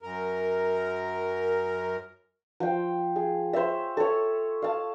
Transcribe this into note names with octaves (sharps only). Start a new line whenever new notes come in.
F#2 A#4
F3 G5
G#4
C5 C#5 E5
A4 C#5
F5 A5